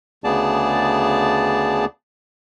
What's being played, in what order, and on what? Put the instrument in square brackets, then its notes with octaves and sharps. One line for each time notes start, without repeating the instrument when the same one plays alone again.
[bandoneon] D2 C#3 B3 G#4 D5 A5